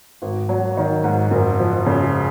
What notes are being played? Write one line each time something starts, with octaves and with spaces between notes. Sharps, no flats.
G#1
F#3
D#3
G#2
F#1
F3
C#3